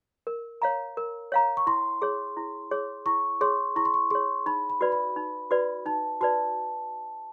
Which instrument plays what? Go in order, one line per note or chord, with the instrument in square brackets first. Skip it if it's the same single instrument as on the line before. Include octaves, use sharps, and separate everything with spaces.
[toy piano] A#4
C#5 F5 A#5
A#4
C#5 F5 A#5
[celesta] C#6
[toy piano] E4 [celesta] C6
[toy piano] G#4 C#5
E4
G#4 C#5
[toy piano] E4 [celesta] C#6
[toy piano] G#4 C#5 [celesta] C6
[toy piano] E4 [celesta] C#6
[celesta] C6
C#6
[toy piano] G#4 C#5 [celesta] C6
[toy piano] D#4 [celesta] B5
[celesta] B5
[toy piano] F#4 B4 D5
[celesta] B5
[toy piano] D#4
F#4 B4 D5
[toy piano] D#4 [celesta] A5
[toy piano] F#4 B4 D5 [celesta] A5